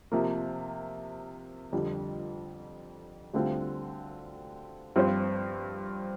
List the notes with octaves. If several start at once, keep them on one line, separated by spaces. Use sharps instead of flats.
C3 F3 A#3
F2 D3 G3
D2 D3 G3 C4 F4
G2 F3 C4 F4 C5